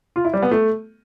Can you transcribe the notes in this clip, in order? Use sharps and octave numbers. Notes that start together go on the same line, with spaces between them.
F4
E4
G3
B3
A3